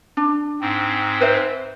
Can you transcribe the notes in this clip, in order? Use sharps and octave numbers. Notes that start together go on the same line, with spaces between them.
D4
G#2 C4
B4 C5 E5